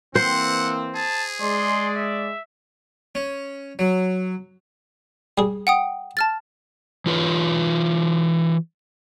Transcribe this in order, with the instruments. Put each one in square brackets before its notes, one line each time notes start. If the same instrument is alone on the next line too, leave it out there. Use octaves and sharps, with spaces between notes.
[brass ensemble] E3 A#3 C4 [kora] C5 [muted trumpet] F#5
[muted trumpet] G#4 [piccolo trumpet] A5
[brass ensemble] G#3 D5 [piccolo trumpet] C6
[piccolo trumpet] E5
[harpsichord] C#4
F#3
G3 G#4
[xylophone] F#5 G5 D#6
A5 F6 A6
[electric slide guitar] E3 F4 B4 C#5